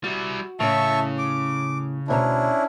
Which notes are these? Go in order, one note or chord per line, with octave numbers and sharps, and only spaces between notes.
G3 E4 F#4
A2 C#3 C#4 E5 A5 C#6
D6
D2 B2 C#4 D4 E4 A#5